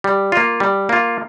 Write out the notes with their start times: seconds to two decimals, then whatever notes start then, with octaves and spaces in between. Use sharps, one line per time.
0.04 G3
0.32 A#3 F4
0.60 G3
0.89 A#3 F4